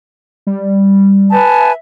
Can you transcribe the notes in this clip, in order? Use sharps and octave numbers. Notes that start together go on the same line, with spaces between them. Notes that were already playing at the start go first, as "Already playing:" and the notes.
G3
B4 G#5 A5
E5